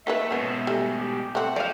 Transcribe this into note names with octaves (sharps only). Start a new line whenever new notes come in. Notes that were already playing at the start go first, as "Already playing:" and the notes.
D#3 A3 A#3 B4 E5
G#2 B2 B3 C#4
G3 A3
G4
A3 C4 F#5
F3 D5 F5